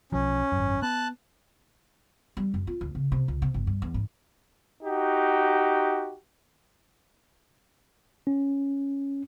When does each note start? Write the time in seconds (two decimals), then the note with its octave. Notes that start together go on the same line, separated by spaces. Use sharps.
0.12 B1 F3 C#4
0.52 G#1 F#2
0.82 B3 A5 F#6
2.37 G3
2.54 F#2
2.67 F4
2.81 D2
2.95 C#3
3.12 C3
3.28 C#2
3.42 C3
3.54 G1
3.67 G2
3.82 E2
3.94 G#2
4.84 D#4 F#4 G4
8.27 C#4